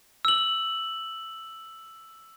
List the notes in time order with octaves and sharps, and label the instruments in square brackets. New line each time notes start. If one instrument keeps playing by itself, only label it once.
[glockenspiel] E6 F#7